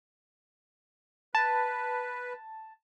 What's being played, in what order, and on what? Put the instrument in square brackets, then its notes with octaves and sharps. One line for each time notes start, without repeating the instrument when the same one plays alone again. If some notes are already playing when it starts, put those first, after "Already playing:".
[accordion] B4 [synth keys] A5